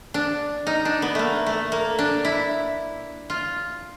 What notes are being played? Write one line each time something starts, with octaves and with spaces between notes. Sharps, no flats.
D4
D#4
D4
B3
A3 A#3
A3
A#3
D4
E4
F4